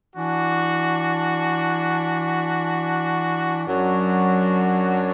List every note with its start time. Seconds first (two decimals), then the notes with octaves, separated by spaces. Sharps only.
0.14 E3 D4 F#4
3.67 F#2 F#3 D4 F#4